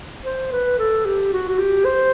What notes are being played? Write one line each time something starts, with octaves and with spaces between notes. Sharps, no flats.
C5
B4
A4
G4
F#4
F#4
G4
C5